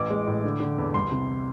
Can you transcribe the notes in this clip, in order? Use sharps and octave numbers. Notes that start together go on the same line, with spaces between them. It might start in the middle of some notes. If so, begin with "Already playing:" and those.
Already playing: A1 E3 D6
G#3
A2
D3
D3
E2
C2 C6
C3